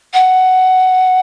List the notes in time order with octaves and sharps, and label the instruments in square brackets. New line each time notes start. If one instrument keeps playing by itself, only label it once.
[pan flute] F#5